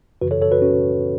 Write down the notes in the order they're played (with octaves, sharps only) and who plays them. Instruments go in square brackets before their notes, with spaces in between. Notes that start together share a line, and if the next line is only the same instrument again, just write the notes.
[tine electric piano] F#2 C#3 E3 F#4 B4
A4 C#5
A4 C#5
F#4 B4
C#4 F#4